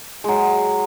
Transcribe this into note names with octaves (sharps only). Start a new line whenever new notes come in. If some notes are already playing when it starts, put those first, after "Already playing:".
F#3 G#3